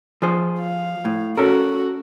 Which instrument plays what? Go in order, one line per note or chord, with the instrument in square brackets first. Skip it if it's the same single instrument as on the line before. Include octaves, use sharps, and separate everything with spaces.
[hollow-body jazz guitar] F3 G#4 C5
[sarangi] F5
[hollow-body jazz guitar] A2
[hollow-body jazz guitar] C#4 A4 A#4 [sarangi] F#4